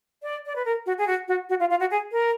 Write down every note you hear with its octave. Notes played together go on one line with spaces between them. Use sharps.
D5
D5
B4
A#4
F#4
G#4
F#4
F#4
F#4
F4
F4
F#4
G#4
A#4